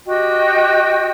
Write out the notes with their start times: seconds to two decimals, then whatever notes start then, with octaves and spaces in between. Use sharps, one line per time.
0.06 F#4 G4 D#5 G5